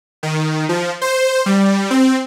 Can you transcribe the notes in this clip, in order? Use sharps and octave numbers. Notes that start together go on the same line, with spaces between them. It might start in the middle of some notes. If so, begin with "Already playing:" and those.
D#3
F3
C5
G3
C4